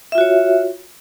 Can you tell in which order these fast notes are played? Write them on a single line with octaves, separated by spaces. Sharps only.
E5 F4 F#4 C#5